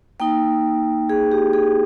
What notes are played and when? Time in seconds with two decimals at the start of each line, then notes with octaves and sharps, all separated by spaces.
0.20 A#3 D#4 G5
1.10 G#4
1.32 G4
1.53 G#4